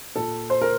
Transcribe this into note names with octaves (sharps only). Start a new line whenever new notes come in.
A#2 A4
C5
A#4